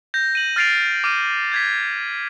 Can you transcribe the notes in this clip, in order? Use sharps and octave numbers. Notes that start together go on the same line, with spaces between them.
G6 A#6
D#7 F#7
F6 A6 C7 D7 F7
D6 F6 D#7
G6 G#6 B6